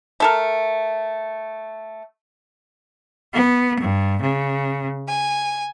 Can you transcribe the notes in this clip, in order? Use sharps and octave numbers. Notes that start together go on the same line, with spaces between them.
A3 A4 A#4
B3
G2
C#3
G#5